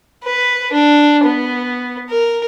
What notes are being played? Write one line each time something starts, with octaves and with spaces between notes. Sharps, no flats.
B4
D4
B3
A#4